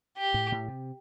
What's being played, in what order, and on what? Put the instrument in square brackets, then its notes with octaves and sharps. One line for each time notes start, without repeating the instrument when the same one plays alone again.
[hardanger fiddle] G4
[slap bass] A2
A2
C3